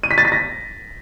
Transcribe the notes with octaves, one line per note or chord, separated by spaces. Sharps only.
D#7
B6
A6
B6
A#6